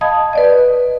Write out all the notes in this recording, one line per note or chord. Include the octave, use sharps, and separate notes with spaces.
D#5 F5 A5 B5 D#6 G#6
B4 D5 D#5